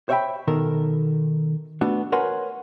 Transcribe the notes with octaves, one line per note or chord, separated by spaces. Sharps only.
C5 C#5 E5 F#5 G5 B5
B2 D#3 A4 A#4
A3 B3 D4 F#4
A#4 B4 C#5 F#5 G#5 C6